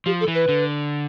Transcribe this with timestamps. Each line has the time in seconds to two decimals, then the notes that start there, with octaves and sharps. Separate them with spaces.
0.06 F3 G4
0.20 A4
0.28 E3
0.34 B4
0.49 D3